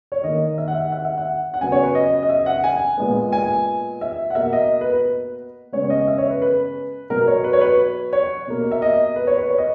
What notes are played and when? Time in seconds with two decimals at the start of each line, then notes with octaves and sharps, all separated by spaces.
0.12 C#5
0.23 D#3 A#3 D#5
0.58 E5
0.68 F#5
0.75 E5
0.92 F#5
1.05 E5
1.17 F#5
1.54 F#5
1.60 C#3 F#3 B3 G#5
1.72 C#5
1.83 B4
1.95 D#5
2.23 D#5
2.29 E5
2.46 F#5
2.64 G#5
2.98 A#2 G#3 B3
3.32 G#5
4.01 E5
4.30 F#5
4.35 B2 A#3 E5
4.53 D#5
4.81 B4
4.93 B4
5.72 C#3 G#3 B3 C#5
5.84 C#5
5.90 D#5
6.08 E5
6.18 C#5
6.30 B4
6.42 B4
7.10 B2 F#3 B3 A#4
7.27 C#5
7.44 B4
7.53 C#5
7.61 B4
8.13 C#5
8.47 B2 A#3
8.71 E5
8.82 D#5
9.16 B4
9.27 C#5
9.39 B4
9.50 C#5
9.58 D#5